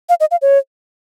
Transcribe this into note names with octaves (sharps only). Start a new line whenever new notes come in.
F5
D#5
F5
C#5